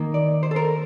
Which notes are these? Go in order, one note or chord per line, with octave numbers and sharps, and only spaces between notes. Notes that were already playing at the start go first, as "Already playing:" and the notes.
Already playing: D#3 A#3 D#4
D5
C5
A4
A#4